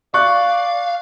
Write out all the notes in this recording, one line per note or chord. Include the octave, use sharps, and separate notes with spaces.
D5 F5 C#6 F#6